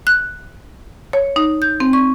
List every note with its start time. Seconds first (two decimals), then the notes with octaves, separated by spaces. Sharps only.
0.07 F#6
1.13 C#5
1.36 D#4
1.62 G6
1.80 C4
1.93 C#6